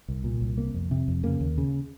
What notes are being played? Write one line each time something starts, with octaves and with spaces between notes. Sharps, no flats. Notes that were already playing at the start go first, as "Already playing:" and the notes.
C2
A#2
C2
C3 A#3
F2
C3
F2
C#3 A#3
D#2
C#3